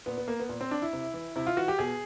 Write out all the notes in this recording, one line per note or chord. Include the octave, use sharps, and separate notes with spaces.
A#2 B3
B3
A#3
B3
A#2
C4
D4
E4
C3
E3
C3 E4
F4
E3 F#4
G4
B2 G#4